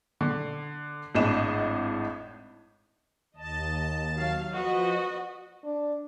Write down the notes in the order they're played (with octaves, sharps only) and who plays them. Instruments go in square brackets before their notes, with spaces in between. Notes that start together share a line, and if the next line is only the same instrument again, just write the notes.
[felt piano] D3
G#1 A2 D4 D#5 E7
[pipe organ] D#2 A5 [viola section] D#5
[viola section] F#3 F5
[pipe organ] F3 [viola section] F#4 B4 D#5
[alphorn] D4